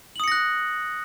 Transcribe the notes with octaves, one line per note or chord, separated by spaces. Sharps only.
D#6 F#6 A#6 C#7 F#7